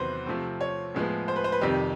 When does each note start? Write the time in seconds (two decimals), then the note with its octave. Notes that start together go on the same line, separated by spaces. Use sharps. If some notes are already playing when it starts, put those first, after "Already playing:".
Already playing: E2 C3 D#3 F#3 B4 C5
0.26 C3 F3 A3 C4
0.61 C#5
0.94 A2 F3 G#3 B3
1.28 C5
1.36 B4
1.44 C5
1.52 B4
1.61 F2 C3 D#3 G3 G4